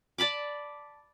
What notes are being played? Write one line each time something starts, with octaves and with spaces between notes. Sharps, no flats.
D5 A5 B5 D6